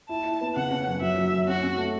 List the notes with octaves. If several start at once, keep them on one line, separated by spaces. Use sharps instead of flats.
E4 A5
E4
B3
C#3 F#5
C#4
F#2
F#3 E5
F#3
F#2
C#4 F#4
C#4
A3